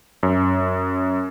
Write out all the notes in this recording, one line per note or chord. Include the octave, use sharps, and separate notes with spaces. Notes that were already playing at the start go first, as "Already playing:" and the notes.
F#2